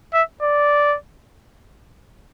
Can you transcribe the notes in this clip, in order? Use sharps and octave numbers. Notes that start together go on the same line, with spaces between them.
E5
D5